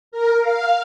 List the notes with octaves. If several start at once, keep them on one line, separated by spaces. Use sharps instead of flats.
A#4
F5